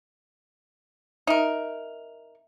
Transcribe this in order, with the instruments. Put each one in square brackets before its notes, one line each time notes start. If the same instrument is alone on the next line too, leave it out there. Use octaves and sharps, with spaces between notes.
[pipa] D#4 A#4 [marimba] E5